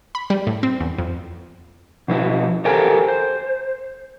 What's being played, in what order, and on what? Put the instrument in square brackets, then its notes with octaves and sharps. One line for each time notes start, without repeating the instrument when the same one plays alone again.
[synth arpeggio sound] B5
G3
A2
C4
E2
F2
[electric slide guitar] B2 F3 E4
G4 A4 A#4 C5 G5 G#5
C5